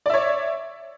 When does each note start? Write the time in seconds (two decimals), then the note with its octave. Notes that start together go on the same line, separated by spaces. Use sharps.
0.06 D5
0.10 E5
0.14 C#5